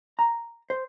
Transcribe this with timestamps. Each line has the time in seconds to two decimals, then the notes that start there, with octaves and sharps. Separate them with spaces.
0.19 A#5
0.70 C5